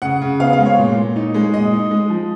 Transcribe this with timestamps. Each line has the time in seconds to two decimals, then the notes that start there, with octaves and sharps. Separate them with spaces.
0.02 C#3 F#5
0.22 C#3
0.40 B3 F5
0.53 F5
0.58 G#3
0.66 C#5
0.78 A#2
0.97 A#2
1.16 D#4
1.34 G#3
1.54 A#2 D#5
1.73 D#4
1.91 G#3
2.10 F3